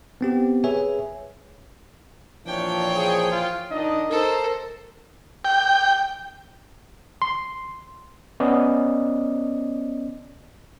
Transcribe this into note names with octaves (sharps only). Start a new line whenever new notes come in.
B3 C4 G4
G#4 B4 C#5 E5 G#5
A#2 E3 F3 D4 C#5 G5
G#4
F4
D#3 D4 D#4 D#5
A4 A#4 C5
G5
C6
B3 C#4 D5 D#5